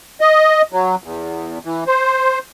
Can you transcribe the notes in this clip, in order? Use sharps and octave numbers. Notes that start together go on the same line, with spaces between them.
D#5
F#3
E2
E3
C5